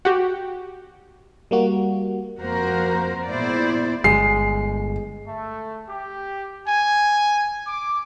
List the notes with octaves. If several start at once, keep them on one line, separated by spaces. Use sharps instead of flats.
F#4 G4
G3 A#3 F#4
F2 A#3 F#4 A#4 C5
A#2 B3 E4 G#4 C5 D5
G1 G#3 C7
A3
G4
G#5
D6